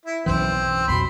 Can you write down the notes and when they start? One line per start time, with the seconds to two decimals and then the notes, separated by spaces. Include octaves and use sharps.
0.06 E4
0.26 B1 F#2 E3 C4
0.88 B1 F2 B2 B5 C6